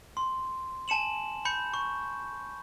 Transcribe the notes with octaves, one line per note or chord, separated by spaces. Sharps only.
C6
G#5 A5 C#7 E7 F#7
B5 G6 C#7
C#6